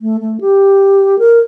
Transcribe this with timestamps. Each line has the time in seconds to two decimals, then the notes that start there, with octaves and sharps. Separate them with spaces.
0.01 A3
0.21 A3
0.41 G4
1.19 A#4